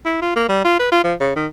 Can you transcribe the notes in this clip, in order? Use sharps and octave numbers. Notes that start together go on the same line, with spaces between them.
E4
F4
A#3
G3
F4
B4
F4
F3
C#3
D#3